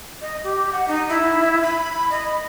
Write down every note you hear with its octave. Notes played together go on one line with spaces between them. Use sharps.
D#5
G4
F#5
D#4
E4
B5
D#5